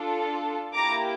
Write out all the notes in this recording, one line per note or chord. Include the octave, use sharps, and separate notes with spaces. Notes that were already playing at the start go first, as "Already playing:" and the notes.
Already playing: D4 F4 A4
A#3 E4 G4 A#5 D6